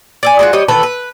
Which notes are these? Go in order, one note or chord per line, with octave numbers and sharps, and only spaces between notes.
D5 E5 G#5
G#3 A#3 F4 F#4
G3 C#5 D#5
D#3 E3 A4 B4
B4